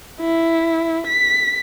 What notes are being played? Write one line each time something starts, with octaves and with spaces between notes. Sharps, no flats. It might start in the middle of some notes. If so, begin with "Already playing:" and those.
E4
B6